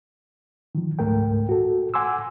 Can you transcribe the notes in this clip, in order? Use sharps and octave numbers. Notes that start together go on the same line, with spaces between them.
D#3 F3
C#2 G#2 A3 A#4 G5
F#4 A4
F#5 G#5 C6 D6 E6